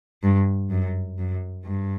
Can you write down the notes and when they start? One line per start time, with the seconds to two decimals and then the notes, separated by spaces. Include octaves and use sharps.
0.23 G2
0.71 F#2
1.18 F#2
1.65 G2